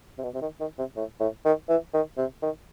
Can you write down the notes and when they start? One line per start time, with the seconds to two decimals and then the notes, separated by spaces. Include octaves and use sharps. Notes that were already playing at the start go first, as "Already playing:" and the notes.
0.18 C3
0.23 B2
0.34 C3
0.42 D#3
0.60 D#3
0.79 C3
0.96 A2
1.20 A2
1.45 D#3
1.69 E3
1.94 D#3
2.18 C3
2.42 D#3